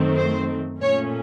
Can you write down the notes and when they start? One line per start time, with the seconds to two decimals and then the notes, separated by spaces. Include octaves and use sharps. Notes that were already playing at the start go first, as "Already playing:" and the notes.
Already playing: F#2 D#3 A3 C4
0.16 C5
0.81 A#2 A3 C#4 C#5